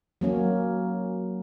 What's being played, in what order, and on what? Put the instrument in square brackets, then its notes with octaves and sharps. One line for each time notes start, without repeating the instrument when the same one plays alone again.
[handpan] F#3 A#3 C#4